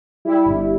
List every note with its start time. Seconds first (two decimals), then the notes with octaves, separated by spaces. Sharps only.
0.25 G3 E4
0.46 G1